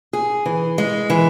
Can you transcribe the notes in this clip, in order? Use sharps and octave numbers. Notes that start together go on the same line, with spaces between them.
G#4
E3
G#3
E3